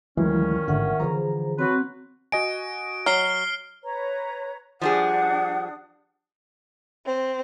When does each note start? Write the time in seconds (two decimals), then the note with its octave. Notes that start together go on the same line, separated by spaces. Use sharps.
0.17 D2 A#2 D#3 E3 F#3 G#3 C#4 E4
0.68 A1 G#2 D3 E5 F#5
1.00 D3 E3 F3 G#4 C5 A#5
1.59 F#3 C4 F#4 B4
2.32 F#4 D#5 G#5 D7
3.06 F#3 F6 C7 G7
3.84 B4 C#5 A#5
4.81 F3 G3 D4 G#4 F#5 D#6
7.06 C4